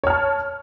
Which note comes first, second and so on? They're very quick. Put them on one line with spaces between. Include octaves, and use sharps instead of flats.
C#5 F6 A5